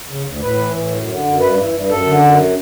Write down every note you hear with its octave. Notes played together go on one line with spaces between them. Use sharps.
C#3
D2
A2 B4
E3
A2
F#2
D3
F#2
G2 B4
E3
G2
F#2 A4
D3
F#2